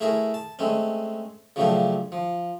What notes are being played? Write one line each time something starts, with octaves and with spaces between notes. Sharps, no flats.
A3 E4 G#4 A#4 C#5
A5
G#3 A3 C4 C#4
C#3 F3 F#3 A3 D4 G4
F3